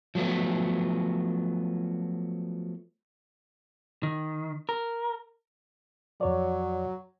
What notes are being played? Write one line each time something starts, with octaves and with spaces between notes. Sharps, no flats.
F3 F#3 G#3 A3 B3
D#3
A#4
F2 F#3 C#5 D5